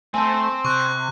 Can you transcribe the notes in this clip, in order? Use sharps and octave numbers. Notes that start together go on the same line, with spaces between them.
A3 C4 C5 G#5 A5 E6
C3 C#6 F#6